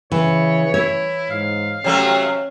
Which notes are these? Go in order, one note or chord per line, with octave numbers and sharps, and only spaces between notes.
C#3 E3 C#5
E4 C#5
G#2 F5
C3 F#3 A3 C#4